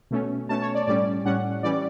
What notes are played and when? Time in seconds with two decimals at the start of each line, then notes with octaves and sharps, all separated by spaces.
0.11 B2 A3 C#4
0.49 B2 A3 C#4 A5
0.62 C#5
0.75 D5
0.87 A2 G3 C#4 D5
1.25 A2 G3 C#4 F#5
1.63 E3 G3 C#4 D5